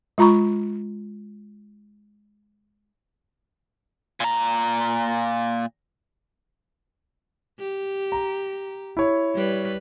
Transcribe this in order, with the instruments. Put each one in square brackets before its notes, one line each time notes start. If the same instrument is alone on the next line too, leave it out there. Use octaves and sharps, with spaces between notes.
[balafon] G#3 F4 A#5 B5 C#6
[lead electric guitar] A#2 A#5
[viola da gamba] G4
[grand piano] A#5
E4 C#5
[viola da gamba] G3 B4